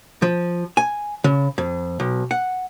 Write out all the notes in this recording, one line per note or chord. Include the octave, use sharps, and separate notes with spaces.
F3
G#5
C#3
F2
B1
F#5